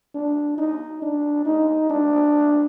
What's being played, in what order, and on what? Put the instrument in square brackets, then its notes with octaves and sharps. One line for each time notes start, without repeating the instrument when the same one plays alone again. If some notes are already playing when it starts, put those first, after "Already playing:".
[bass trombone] D4
D#4
D4
D#4
D4